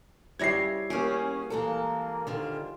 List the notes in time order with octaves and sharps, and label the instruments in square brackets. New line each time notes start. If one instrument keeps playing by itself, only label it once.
[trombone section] C#2 [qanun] G3 E4 C#5 [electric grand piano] G#6 A#6 C7
[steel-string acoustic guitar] A#3 B3 G#4 [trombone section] C#4 [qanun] G4
[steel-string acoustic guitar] E3 G#3 A4 [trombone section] A#3
[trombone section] G#2 G3 F4 [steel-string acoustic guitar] D3 D#3